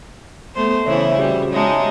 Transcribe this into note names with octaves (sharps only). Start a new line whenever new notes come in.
A3 B3 C5
C#3 E3 E4 C5 C#5 E5
G3 C#4 F#4 G#4
G#3 D#4 F#4 C#5 E5 A5